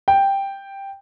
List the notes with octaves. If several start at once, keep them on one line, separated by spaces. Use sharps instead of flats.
G5